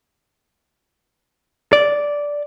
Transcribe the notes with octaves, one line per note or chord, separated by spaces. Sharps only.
D5